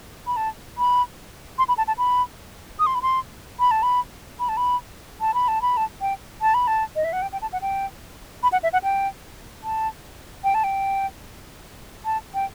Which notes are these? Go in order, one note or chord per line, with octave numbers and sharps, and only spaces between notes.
B5
A5
B5
C6
B5
A5
A5
B5
D#6
C6
B5
C6
B5
A5
B5
B5
A5
B5
A5
B5
A5
B5
A5
G5
A5
B5
A5
D#5
E5
F#5
G5
G5
A5
F#5
G5
B5
F#5
E5
F#5
G5
A5
G5
A5
G5
A5
G5